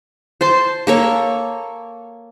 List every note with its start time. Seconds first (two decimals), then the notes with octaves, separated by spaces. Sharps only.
0.41 C5 A5 C6
0.87 A#3 A4 C#5